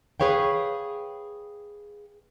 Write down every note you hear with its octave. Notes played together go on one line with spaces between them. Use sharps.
G#4 B4 C#5 F5 G5